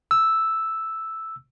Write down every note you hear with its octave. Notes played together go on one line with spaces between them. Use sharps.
E6